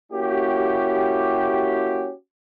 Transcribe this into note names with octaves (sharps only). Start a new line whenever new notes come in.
A#3 C#4 E4 F#4 G4